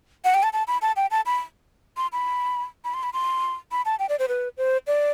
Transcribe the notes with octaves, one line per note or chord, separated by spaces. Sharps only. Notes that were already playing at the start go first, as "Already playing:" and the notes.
F#5
G5
A5
A5
B5
A5
G5
A5
B5
C6
B5
B5
C6
B5
C6
B5
A5
G5
D5
C5
B4
C5
D5